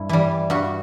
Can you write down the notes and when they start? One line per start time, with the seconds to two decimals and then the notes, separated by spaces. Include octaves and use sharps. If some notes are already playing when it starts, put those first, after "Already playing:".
Already playing: G2 E4
0.09 E3 G3
0.50 G2 F#4